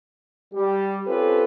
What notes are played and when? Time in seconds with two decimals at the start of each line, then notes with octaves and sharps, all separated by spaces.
0.53 G3 G4
1.06 C4 C#4 F4 G4 A4 B4